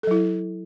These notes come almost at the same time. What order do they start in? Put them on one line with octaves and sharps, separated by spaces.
A4 F#3 E4